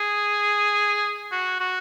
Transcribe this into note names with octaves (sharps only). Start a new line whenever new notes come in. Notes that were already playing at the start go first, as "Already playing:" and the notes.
Already playing: G#4
F#4
F#4